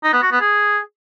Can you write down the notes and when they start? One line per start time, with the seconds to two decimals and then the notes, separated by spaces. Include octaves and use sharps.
0.04 D#4
0.13 B3
0.22 F#4
0.32 B3
0.41 G#4